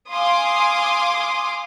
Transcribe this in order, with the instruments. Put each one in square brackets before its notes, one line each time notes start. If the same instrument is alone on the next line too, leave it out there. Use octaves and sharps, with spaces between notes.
[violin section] F5 G#5 C6 D6 D#6